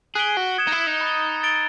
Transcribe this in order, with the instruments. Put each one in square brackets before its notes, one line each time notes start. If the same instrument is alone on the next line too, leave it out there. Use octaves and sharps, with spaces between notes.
[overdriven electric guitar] G#4 [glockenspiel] F#6 B6 D7 G7
[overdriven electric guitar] F#4
[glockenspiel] D#6 G#6 C#7 E7
[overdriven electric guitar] D#4
E4
D#4
[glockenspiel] B5 D#6 F#6 A6
E6 A6 D7 G7